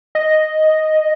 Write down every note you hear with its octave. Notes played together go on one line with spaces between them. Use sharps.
D#5